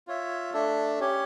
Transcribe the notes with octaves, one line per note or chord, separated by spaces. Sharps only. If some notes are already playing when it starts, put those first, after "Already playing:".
F4 C#5 E5
A3 D4 A4 E5
C#4 G4 C#5